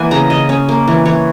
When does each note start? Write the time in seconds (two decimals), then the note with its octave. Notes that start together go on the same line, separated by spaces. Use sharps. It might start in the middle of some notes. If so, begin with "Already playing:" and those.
Already playing: E3 A#3 F#5 G#5
0.11 C#3 A#5
0.30 C#3 D#5
0.49 C#4
0.69 A#3
0.88 E3
1.05 E3 C#5